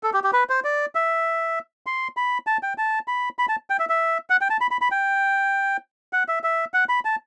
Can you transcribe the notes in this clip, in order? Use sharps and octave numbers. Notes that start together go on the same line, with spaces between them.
A4
G4
G4
B4
C5
D5
E5
C6
B5
A5
G5
A5
B5
B5
A5
G5
E5
E5
F#5
G5
A5
B5
B5
B5
G5
F#5
E5
E5
F#5
B5
A5